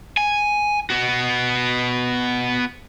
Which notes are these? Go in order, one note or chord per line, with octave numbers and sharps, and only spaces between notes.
G#5
B3 F#4